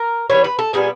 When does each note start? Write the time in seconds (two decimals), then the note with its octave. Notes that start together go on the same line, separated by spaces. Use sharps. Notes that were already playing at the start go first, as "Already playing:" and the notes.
Already playing: A#4
0.30 E3 G3 B3 C#5
0.44 B4
0.59 A4
0.73 A#2 G3 B3 G#4